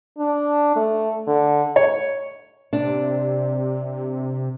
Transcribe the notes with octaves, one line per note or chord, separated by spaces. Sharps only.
D4
A3
D3
C#5
C3 D4